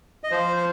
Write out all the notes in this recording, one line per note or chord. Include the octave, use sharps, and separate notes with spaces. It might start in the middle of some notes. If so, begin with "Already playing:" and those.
D#5
F3 C5
C5